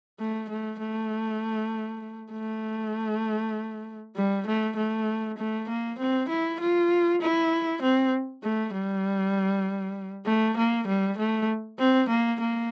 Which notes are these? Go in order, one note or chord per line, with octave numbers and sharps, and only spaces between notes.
A3
A3
A3
A3
G3
A3
A3
A3
A#3
C4
E4
F4
E4
C4
A3
G3
A3
A#3
G3
A3
C4
A#3
A#3